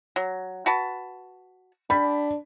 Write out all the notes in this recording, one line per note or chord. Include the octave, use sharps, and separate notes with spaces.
F#3
F#4 B4 A5
G3 D4 B5